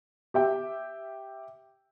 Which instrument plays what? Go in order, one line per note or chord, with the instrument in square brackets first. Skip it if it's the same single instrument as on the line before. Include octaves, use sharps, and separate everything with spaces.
[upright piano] G4 E5 G5